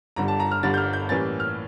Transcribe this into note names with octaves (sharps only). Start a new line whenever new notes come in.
G1 G2 D3 G3 A#5
A5
A#5
F6
G1 G2 D3 G3 A6
G6
F6
G6
A2 E3 G3 A#3 C#4 A6
F6